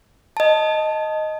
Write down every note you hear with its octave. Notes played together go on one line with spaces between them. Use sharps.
D#5 A5